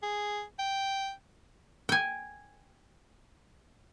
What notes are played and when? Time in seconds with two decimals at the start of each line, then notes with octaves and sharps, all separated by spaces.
0.03 G#4
0.59 G5
1.89 G5 G#5